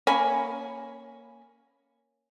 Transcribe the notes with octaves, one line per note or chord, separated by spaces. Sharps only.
A#3 C#4 G#5 B5